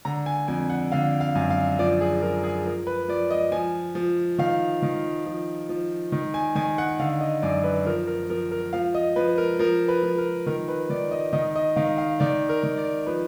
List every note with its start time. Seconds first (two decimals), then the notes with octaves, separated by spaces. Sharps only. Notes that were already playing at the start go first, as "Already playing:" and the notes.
0.05 D3 A#5
0.26 G#5
0.48 F2 G#5
0.70 F#5
0.92 D3 F5
1.21 F5
1.35 F#2
1.50 F5
1.79 F3 D5
2.01 G#4
2.22 F3 A#4
2.44 G#4
2.65 F3 A#4
2.87 B4
3.08 F3 D5
3.31 D#5
3.52 F3 G#5
3.95 F3
4.38 D#3 F5
4.82 D#3
5.26 F3
5.69 F3
6.12 D#3
6.34 G#5
6.55 D#3 G#5
6.78 F#5
6.99 D3 F5
7.21 D#5
7.42 F#2 D5
7.64 B4
7.86 F3 A#4
8.07 A#4
8.30 F3 A#4
8.52 A#4
8.73 F3 F5
8.95 D#5
9.16 F3 B4
9.38 A#4
9.59 F3 A#4
9.88 B4
10.03 F3
10.18 A#4
10.46 D#3 A#4
10.68 B4
10.90 D#3 D5
11.11 D#5
11.33 D#3 D#5
11.56 D#5
11.76 D#3 F5
11.98 F5
12.20 D#3 D5
12.49 A#4
12.63 D#3
12.77 D5
13.06 F3 B4